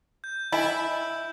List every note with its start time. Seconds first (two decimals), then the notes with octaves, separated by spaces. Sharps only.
0.24 G6
0.52 E4 D#5 G#5 B5